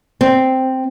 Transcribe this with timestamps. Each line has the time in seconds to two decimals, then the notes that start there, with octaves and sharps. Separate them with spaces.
0.21 C4